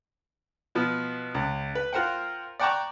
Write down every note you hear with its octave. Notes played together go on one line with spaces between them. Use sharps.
B2 F3 B3
C#2
B4
F4 A#4 C5 F#5 G5
D5 F#5 G5 A5 A#5 C#6